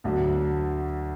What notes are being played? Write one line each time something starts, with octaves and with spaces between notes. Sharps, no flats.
D2 D3 F#3